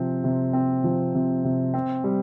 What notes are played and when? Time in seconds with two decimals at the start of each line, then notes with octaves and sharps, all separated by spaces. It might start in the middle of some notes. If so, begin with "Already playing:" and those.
Already playing: C3 F3 C4
0.24 C3
0.53 C4
0.84 F3
1.15 C3
1.44 C3
1.74 C4
2.04 G3